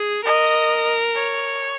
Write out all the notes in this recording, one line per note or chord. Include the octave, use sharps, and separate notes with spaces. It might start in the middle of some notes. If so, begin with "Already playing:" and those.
Already playing: G#4
A#4 D#5
C#5